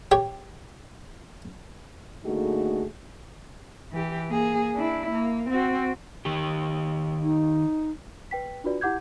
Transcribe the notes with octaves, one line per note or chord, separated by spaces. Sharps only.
G4 C#5
D3 A3 A#3 D#4 F#4 G#4
E3 G4
A#3 G#4
D4 E4
A#3
C4 F#4
D#3 G4
D#4
B4 G5 B6
D4 F4 F#4 B4 D5
E4 G4 F#5 D6 G6 G#6